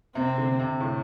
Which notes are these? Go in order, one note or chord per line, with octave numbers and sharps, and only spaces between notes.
C3 C4
D3
C3
A2